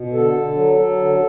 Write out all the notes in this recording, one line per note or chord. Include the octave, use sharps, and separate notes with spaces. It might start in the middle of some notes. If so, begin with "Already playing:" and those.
Already playing: B2
D3 A4
D3
F#3
F#3
D3